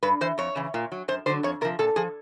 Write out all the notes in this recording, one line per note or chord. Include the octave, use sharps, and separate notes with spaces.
G2 B4
E3 C5
F2 C#5
C#3 E3
A#2
F#3
F#2 C5
D3 F#3 C5
F2 C#5
C3 F3 A#4
A#2 A4
F3 G#4